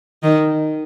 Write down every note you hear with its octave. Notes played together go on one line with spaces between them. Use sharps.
D#3